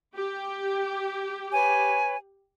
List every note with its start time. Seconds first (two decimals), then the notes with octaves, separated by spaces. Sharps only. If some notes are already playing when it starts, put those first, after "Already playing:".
0.16 G4
1.53 B4 C#5 G#5